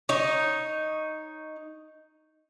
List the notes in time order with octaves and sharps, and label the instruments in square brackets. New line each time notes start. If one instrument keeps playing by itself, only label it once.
[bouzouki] D#4 C#5